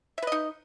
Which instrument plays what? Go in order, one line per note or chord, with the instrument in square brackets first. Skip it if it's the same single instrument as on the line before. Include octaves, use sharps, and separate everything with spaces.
[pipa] E5
B4
D#5
D#4